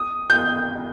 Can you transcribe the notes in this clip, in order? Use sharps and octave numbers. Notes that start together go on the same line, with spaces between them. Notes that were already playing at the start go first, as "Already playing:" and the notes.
Already playing: D#6
G6